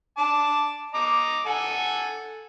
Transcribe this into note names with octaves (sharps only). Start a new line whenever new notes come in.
A5 D6
D#5 A#5 D6
A4 F#5 G#5